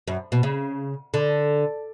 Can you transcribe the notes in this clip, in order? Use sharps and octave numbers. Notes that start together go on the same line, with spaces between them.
F#2
B2
C#3
D3